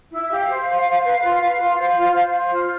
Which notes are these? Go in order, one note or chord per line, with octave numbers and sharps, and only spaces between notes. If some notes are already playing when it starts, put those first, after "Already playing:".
E4
G4 F5
C5
C5
C5
B4
F4
B4
F4
C5
F4
C5
C5
F4